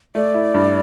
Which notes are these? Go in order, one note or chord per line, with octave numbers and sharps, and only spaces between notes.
A3 D5
E4
G2